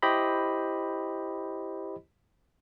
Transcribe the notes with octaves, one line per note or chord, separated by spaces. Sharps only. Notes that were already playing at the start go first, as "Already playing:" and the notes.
E4 G4 C5 D#5 B5